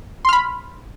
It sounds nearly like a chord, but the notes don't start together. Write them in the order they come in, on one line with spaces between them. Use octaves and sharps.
C6 F6 B5